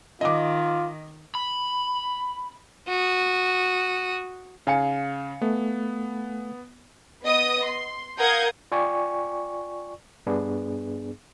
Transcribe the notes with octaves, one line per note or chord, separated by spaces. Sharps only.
D#3 F4 D#5 D6
B5
F#4 D#6
C#3 F5 G#5 C#7
A3 B3
B3 D#5 D#6
C6
A#4 F5 F#5 D#6 G6 G#6
F4 D5 G5 G#5 C#6
G2 B3 D4 G#4